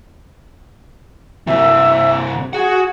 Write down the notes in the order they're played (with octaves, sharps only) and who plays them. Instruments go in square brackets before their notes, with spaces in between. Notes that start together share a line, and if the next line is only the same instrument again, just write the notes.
[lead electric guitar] C3 E3 [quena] E5
[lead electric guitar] F#4 F#5 [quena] G#4